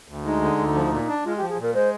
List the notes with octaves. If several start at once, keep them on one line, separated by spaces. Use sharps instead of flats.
D2
G#3 D#4
D3
D2
F3
A#2
D4
G#3 F4
F3 G4
G#4
A#2 A#4
G#3 C5